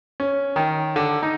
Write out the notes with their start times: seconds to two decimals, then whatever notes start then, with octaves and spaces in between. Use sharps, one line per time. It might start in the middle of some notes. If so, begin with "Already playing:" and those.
0.20 C#4
0.56 D#3
0.96 D3
1.23 D#4